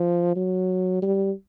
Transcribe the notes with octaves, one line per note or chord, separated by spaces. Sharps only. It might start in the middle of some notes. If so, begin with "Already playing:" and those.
Already playing: F3
F#3
G3